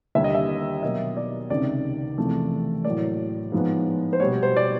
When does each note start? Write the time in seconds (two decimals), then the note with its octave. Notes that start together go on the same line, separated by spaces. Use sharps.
0.15 D#2 D3 G3 E5
0.24 D#5
0.35 E5
0.82 B2 F#3 A#3 D#5
1.17 D5
1.50 C#2 C3 D#3 D5
2.18 E2 C3 F3 A3
2.85 A2 F#3 A#3 D5
3.52 G#2 F3 G#3 B3
4.13 C5
4.20 B2 G3 B3 C#5
4.43 C5
4.57 D5